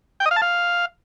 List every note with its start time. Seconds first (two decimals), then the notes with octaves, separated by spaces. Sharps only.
0.20 G5
0.26 D#5
0.31 F5
0.36 A5
0.42 F5